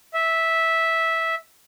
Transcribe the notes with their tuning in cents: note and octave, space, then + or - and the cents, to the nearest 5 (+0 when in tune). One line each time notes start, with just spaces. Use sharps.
E5 -10